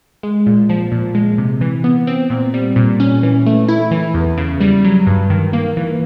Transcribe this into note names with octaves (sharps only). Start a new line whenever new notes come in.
G#3
A#2
F3
A#2
G#3
C3
E3
B3
C4
A#2
G3
A#2
C#4
E3
A3
E4
E3
E2
C#3
G3
F#3
G2
D#3
A#3
E3